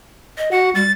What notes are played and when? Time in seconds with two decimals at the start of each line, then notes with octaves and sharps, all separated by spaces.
0.38 D#5
0.51 F#4 F#5
0.75 G3 A6